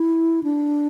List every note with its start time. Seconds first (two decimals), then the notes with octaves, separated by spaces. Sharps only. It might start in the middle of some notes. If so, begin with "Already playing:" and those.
Already playing: E4
0.44 D4